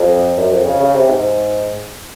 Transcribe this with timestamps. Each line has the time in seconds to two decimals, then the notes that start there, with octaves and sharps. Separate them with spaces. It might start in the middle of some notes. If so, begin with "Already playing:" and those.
Already playing: F2
0.37 F#2
0.52 F2
0.65 C#3
0.80 C#3
0.94 C3
1.09 G#2